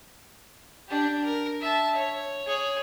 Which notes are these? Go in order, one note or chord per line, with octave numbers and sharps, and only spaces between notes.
D4 G4
A#4
E5 A5
C#5
G#4 C#5